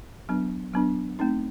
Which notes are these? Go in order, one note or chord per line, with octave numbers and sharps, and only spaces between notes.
F#3 B3 D4
F#3 B3 D4
A3 C4 D#4